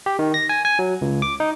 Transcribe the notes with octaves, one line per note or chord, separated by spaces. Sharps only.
G4
D#3
A#6
G#5
G#5
F#3
C#2
D6
D#4